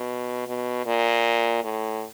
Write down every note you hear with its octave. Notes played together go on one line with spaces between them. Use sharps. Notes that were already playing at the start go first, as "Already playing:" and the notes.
Already playing: B2
B2
A#2
A2